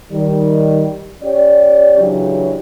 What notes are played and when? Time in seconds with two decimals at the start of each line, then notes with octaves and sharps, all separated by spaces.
0.11 D#3 G3
1.22 C#4 G4 C#5 D5
1.97 C#3 E3 F#3 D4 G4 C#5